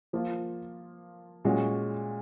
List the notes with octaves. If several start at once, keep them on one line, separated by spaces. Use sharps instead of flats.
F3 A#3 F4
A#2 G#3 C#4 F#4